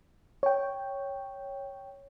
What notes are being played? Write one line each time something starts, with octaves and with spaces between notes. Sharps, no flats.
C#5 G5